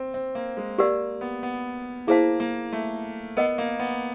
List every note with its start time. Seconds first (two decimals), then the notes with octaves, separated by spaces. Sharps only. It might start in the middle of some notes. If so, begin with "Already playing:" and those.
Already playing: C4
0.14 C4
0.35 A#3
0.57 G#3
0.78 A#3 G4 A#4 D5 F#5
1.21 B3
1.43 B3
2.07 A#3 E4 G#4 C5 F5 A5
2.40 A#3
2.73 A3
3.37 B3 A#4 D#5 F#5
3.58 A#3
3.79 B3